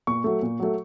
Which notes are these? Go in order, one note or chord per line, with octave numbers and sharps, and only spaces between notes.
A#2 C#6
F#3 A3
A#2
F#3 A3